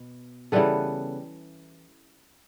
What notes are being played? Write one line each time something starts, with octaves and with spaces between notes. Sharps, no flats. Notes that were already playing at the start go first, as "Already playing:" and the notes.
Already playing: B2 B3
C#3 E3 G3 B3 A4 B4